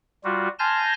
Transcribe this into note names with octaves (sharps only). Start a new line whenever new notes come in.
G3 F4 F#4
G#5 A5 C6 F6 G6 A#6